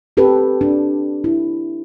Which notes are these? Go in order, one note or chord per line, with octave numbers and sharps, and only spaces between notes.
C4 G4 A4 B4
D4
E4